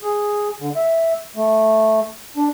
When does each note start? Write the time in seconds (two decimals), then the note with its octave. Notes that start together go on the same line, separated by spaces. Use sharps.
0.02 G#4
0.60 D3
0.76 E5
1.36 A3
2.37 D4